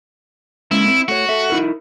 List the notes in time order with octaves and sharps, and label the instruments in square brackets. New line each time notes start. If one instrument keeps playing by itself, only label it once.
[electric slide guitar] G#3 A#3 C#4 [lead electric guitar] E4
[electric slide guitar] C4
[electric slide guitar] A3 C#5 [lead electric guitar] F#4
[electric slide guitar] A4 E5
D#4 E4 A#4